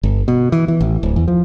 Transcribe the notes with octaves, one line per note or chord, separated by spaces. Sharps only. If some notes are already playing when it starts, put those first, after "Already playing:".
G1
B2
E3
E3
A1
D1
E2
F3